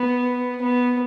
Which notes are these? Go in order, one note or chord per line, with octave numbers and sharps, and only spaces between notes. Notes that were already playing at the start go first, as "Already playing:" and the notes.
Already playing: B3
B3